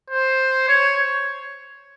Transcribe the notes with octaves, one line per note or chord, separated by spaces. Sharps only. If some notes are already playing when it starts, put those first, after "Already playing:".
C5
C#5